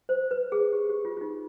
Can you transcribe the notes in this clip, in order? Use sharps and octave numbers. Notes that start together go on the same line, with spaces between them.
C5
B4
G#4
G4
G4
F4
F4
D#4